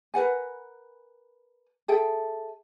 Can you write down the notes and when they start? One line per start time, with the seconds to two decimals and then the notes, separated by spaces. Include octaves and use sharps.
0.14 A#4 B4 F#5 G#5
1.88 G#4 A4 E5 G5